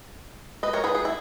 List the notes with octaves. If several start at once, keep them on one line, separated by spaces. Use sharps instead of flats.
B4 D#5
A#4 C#5
G#4 B4
G#4 B4
E4